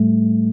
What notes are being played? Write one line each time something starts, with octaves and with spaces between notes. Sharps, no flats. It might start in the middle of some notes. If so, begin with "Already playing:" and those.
Already playing: A2 G3 A3